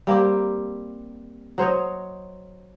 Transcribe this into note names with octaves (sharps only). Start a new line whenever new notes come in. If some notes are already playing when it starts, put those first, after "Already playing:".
G3 A#3 C4 G4
F#3 C5 C#5 D#5